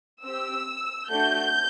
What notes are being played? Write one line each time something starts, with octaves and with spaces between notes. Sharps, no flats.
C4 G4 E6
A3 D4 F#4 G6